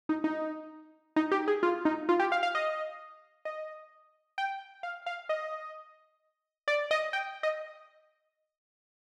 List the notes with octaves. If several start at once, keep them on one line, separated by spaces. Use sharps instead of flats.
D#4
D#4
D#4
G4
G#4
F4
D#4
F4
G4
F5
F5
D#5
D#5
G5
F5
F5
D#5
D5
D#5
G5
D#5